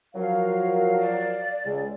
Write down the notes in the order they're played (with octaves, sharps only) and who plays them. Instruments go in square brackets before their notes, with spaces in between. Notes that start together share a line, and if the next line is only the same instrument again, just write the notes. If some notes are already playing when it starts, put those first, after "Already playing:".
[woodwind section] F3 F#3 [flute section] A#4 F5
[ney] D5
[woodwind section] C#2